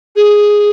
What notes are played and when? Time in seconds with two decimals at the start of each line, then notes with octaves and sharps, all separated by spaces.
0.16 G#4